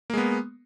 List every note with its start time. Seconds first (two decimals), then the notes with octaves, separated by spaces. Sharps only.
0.10 A#3
0.14 G#3
0.17 B3